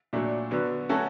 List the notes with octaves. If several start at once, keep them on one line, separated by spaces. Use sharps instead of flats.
A#2 F#3 A3 D4
D3 F#3 B3
F#3 A3 C#4 F#4 A4